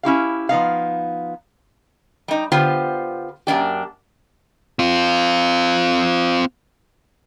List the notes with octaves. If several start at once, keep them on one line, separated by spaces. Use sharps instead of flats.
C#4 E4 G4 F5
F3 B3 D#4 F5
G3 D#4
D3 B3 F4 G4 C5
F#2 A#3 D4 G4
C4 F4